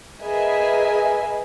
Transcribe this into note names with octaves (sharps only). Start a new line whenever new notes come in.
G#4 A#4 B4 D#5 E5 G#5